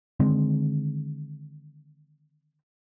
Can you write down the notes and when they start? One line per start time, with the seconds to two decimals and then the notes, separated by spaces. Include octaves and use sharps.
0.20 D3 D#3 G#3 C4